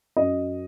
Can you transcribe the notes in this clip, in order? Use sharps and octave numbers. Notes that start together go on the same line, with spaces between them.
F#2 D#5